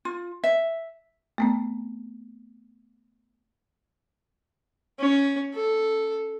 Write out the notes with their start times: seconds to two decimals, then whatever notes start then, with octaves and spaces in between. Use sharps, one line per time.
0.05 F4
0.44 E5
1.38 A3 B3 C4
5.00 C#4
5.54 A4